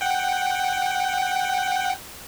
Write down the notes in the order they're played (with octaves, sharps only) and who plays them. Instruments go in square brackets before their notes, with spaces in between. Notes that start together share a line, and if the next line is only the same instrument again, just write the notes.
[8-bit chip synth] F#5 G5